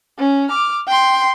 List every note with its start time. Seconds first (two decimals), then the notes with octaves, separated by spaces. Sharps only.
0.19 C#4
0.49 D6 F6
0.87 G5 C6